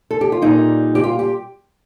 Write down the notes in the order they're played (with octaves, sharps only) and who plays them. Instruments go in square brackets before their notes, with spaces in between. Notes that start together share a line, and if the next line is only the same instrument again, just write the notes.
[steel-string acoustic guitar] A4
G4
F4
A#2 G3 D#4
G4
F4
G4